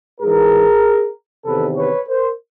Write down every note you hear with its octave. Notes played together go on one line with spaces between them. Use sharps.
G#2 E3 G#4 A#4
E2 C3 D#3 A4 B4
B4 C#5
A#4 C5